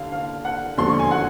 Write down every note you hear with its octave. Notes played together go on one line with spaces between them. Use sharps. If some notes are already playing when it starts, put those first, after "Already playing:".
Already playing: D#2 D3 F5
F5
F#5
E1 D#2 D3 F3 C6
C#6
G#5
F#5